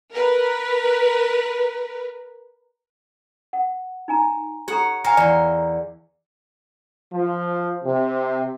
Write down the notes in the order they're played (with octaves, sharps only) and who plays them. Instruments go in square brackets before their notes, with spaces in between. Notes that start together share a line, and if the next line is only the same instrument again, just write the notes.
[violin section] A#4 B4
[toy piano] F#5
D#4 G#5 A#5
[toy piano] G4 A4 A#5 [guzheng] C#5 F#5
[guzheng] A#4 C#5 F5 [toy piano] G#5 A#5
[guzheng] E2 C6 [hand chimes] D5
[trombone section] F3
C3